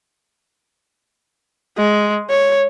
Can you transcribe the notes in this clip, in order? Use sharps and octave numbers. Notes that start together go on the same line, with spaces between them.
G#3
C#5